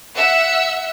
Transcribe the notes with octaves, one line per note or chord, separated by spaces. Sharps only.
E5 F#5 E6